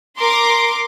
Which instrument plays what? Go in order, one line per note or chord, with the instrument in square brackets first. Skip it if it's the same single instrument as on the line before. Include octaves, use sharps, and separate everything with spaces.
[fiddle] A#4 [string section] C6 D6